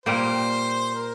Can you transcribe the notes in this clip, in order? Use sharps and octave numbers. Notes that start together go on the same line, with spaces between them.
A#2 G3 A#3 C5
A#4